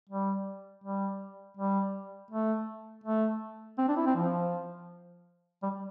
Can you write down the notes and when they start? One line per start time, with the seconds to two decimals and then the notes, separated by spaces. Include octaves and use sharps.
0.09 G3
0.84 G3
1.57 G3
2.31 A3
3.04 A3
3.78 C4
3.88 D4
3.97 E4
4.06 C4
4.15 F3
5.63 G3